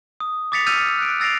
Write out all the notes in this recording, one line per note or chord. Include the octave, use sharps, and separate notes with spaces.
D#6
D6 D#6 A6 B6 C#7 F7
E6 F6 G6 A6 D#7 F7
F#6 D7
E6 A6 A#6 C7 D7 F7